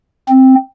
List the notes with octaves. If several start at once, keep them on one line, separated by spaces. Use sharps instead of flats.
C4